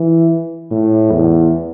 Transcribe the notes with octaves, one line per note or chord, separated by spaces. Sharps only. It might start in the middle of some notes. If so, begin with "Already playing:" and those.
Already playing: E3
A2
E2